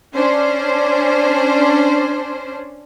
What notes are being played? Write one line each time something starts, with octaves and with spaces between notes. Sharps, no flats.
C#4 D4 C5